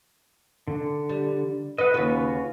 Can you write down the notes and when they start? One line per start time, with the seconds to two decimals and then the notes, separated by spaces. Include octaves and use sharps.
0.68 D3
1.09 G3
1.78 B4 D#5 F#5
1.94 D#2 C#3 F4 F#4 B4